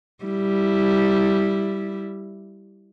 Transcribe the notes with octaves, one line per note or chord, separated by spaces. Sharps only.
G3 E4